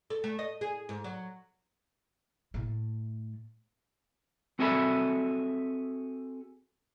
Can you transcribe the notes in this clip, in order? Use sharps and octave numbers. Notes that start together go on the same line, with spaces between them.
A4
A3
D#5
G#4
G#2
F#3
A2 A3
C4 F#4 G#4 A4 E5 B5